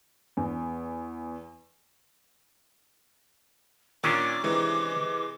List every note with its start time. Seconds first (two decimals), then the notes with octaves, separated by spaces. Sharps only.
0.37 E2
4.04 A#2 D#3 C#4 D4 D6
4.44 C3 E3 G#3